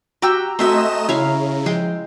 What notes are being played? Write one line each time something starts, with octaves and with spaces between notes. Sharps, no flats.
F#4 G4 G5 A#5 E6
A3 C4 F#4 C5 D#5 E5 G#5 E7
C#3 E4 C#5 F5
F3 G#3 G5 C6